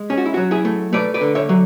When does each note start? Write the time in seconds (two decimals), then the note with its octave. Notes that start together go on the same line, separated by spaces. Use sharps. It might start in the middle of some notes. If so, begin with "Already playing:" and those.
Already playing: G#3
0.10 C#4 G#4
0.18 F#4
0.26 E4
0.34 F#3 F#4
0.51 E4 G#4
0.65 A3
0.93 A3 B4 D5
1.14 B4 D5
1.21 D3
1.35 C#5 E5
1.49 F#3